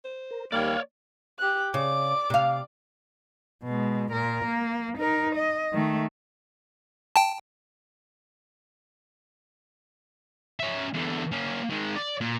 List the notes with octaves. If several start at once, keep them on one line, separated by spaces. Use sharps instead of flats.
C5
A#4
D#2 G3 A#3 C#5 D5 F5 F6
G4 F#6
C#3 D5 D6
C3 F5
B2 G#3
A#2 A#4
A#3
D#4 A#4
D#5
D#3 A3
G5 A5
C#4 E5
E2 D3
A#3 C#4
D#3 G#3
D5
A#2